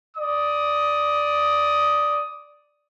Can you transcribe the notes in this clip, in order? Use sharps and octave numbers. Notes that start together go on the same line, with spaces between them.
D5 D#6